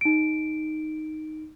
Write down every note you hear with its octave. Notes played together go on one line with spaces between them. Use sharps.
D#4 D7